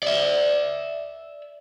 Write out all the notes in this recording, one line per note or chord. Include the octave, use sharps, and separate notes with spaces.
D5 E5